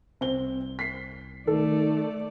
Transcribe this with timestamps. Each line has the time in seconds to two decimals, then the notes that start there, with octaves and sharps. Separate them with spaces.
0.21 C2 C3 C4 G7
0.79 B6 C7
1.47 D#3 A3 A4 D5